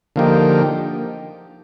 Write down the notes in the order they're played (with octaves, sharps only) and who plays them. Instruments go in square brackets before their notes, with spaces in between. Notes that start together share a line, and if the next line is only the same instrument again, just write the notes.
[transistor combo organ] D3 F3 A#3 D#4 G4